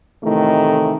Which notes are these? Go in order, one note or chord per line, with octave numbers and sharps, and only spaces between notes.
A2 C3 D#3 E3 A3